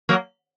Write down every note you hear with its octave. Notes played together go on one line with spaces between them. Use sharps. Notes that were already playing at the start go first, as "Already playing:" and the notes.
F#3 A#3